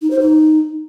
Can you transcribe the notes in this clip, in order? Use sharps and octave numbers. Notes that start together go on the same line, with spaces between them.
D#4
C5
D#4